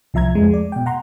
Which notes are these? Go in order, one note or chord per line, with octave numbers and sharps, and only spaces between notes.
C2 F3 E5 A#5 G#6
F2 G#3
D5
B2 G5
F#5 A#5 C6